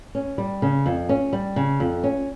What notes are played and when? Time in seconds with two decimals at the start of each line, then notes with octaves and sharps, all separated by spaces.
0.15 C#4
0.38 G3
0.62 C#3
0.86 F2
1.09 C#4
1.33 G3
1.56 C#3
1.80 F2
2.04 C#4